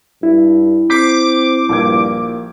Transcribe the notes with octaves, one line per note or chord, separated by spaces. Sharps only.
G2 E4
C4 D6 G6 B6 C7
A#1 G2 A#3 G#6